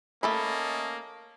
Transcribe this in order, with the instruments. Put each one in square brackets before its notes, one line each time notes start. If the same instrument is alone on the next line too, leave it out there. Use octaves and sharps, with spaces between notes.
[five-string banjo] A3 A4 B5 [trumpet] A#3 [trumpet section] C#4 D#5 A5